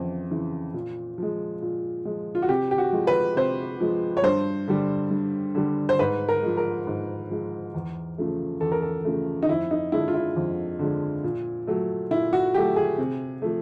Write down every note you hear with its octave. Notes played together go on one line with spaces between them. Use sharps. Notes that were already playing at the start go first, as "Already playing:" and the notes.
Already playing: F2 C#3 E3
C#3 E3
A#2
F3 G#3
A#2
F3 G#3
F4
F#4
C3 G4
G4
F#4
F3 G#3
B4
C3 C5
F3 G#3
C#5
G2 C5
D3 G3
G2
D3 G3
C5
G#2 B4
A#4
F3 G#3
A#4
G#2
F3 G#3
E2
C#3 F3 A3
E2 A4
A#4
A4
C#3 F3 A3
D#4
F2 E4
D#4
D3 F3 G#3 E4
F4
E4
F2
D3 F3 G#3
A#2
F#3 A3
A#2 E4
F#4
F#3 A3 G4
G#4
C3
F3 A3